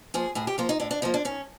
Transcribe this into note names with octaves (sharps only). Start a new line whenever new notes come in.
F3 A#3 G#4
A2 G#4
G4
F3 A#3 F4
D#4
A2 D4
D4
F3 A#3 D#4
D4
D#3 C#4